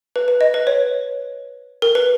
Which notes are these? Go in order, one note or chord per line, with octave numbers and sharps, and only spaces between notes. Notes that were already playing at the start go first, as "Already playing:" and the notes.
B4
B4
D#5
B4
C#5
A#4
B4